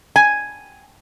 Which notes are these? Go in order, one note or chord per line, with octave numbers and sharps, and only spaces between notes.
G#5